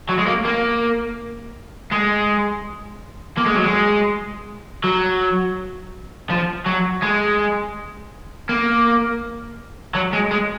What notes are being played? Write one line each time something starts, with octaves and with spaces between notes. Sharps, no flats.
F#3
G#3
A#3
A#3
G#3
A#3
G#3
F#3
G#3
F#3
F3
F#3
G#3
A#3
F#3
G#3
G#3